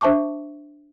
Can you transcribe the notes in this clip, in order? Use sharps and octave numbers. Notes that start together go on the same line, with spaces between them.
D4 C5 E5 A5 C#6 D6